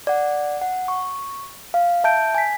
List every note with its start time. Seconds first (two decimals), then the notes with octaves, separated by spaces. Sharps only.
0.07 D5 F#5
0.62 F#5
0.88 C#6
1.74 F5
2.04 E5 A5 G6 D7
2.35 G#5 B6